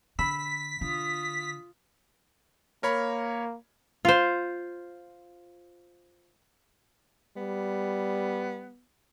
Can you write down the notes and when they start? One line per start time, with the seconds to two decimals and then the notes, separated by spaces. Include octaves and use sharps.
0.19 D3 B5 E6 B6
0.81 D3 F4 D#6
2.83 A#3 A#4 C#5 B5
4.05 F4 C5
7.37 G3 B3